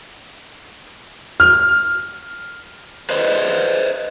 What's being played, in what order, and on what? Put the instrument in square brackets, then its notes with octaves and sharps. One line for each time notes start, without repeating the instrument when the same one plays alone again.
[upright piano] F6
[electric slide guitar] B4 C5 D#5